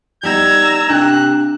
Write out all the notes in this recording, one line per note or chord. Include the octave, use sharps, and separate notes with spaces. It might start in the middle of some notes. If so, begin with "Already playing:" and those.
G3 B3 D#4 A#5 E6 G#6
C3 A#3 D4 G4 F#6